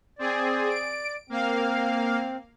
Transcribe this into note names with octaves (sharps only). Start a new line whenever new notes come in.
C4 G#4 D5
D7
A#3 C4 F5